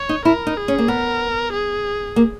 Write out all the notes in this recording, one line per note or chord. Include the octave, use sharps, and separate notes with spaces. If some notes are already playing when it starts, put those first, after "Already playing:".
Already playing: C#5
D#4
E4 A#4
D#4
G#4
C#4
A#3
B3 A#4
G#4
A#3